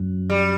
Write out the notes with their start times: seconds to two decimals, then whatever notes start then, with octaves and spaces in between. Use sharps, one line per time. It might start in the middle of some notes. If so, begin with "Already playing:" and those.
Already playing: F#2
0.30 G3